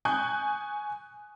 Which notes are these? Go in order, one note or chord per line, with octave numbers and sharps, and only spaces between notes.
G#5 C#6 D#6 F#6 G6